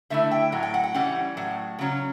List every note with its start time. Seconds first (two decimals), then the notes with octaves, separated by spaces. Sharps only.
0.10 D3 A3 E4 E5
0.31 G5
0.52 A2 F#3
0.63 G5
0.74 F#5
0.84 G5
0.94 E3 G3 C#4 F#5
1.37 A2 F#3
1.79 C#3 F#3 C#4